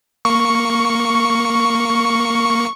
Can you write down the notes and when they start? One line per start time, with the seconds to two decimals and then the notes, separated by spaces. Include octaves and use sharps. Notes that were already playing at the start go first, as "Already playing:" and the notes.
0.25 A#3 C#6 C#7